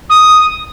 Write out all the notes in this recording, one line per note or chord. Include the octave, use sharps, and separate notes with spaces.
D#6